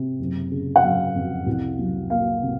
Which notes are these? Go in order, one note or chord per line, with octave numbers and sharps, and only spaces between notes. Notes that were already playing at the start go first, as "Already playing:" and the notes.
Already playing: C3
F#1
C#3
F#5
F#3 F5
F2
C2
F#3
A#3 F5
C3